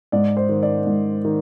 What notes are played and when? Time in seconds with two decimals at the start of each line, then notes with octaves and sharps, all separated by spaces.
0.12 G#2 D5
0.37 C5
0.49 D#3
0.63 D5
0.87 G#2
1.25 D#3